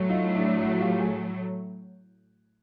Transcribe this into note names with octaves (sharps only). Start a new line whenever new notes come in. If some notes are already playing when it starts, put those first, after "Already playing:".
Already playing: A2 F#3 A3
D#4 F4
D4 E4
E4 F#4
F4 G4
F#4 G#4